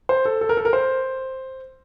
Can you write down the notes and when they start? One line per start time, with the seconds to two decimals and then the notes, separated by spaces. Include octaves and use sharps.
0.09 C5
0.25 A4
0.41 A4
0.49 A#4
0.57 A4
0.65 A#4
0.73 C5